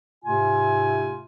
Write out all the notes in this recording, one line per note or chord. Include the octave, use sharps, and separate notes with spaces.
G#2 C3 A3 F4 G#5